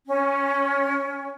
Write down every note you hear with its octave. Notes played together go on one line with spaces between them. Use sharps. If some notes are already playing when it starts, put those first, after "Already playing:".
C#4